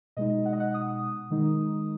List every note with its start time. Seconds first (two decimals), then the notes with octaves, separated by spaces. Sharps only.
0.17 B2 G#3 D#4 D#5
0.45 F#5
0.53 D#5
0.60 F#5
0.74 D#6
1.30 D#3 G#3 D#4